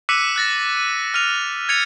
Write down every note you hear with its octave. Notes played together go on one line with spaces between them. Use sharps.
D6 E6 F#6 B6 C#7 D#7
F#6 A6 A#6
D#7
F6 D#7 F7
G#6 A6 C#7 D#7 F7